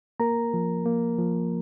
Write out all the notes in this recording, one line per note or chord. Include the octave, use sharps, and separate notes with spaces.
A#3 A#4 A#5
F3
A#3
F3